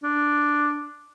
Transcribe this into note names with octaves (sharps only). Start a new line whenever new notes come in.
D4